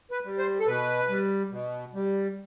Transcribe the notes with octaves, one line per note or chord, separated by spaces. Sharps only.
B4
G3
C5
A4
B2 B4
G3
B2
G3